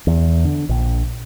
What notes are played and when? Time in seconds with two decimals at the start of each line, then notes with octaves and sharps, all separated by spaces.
0.07 E2
0.45 D3
0.69 A#1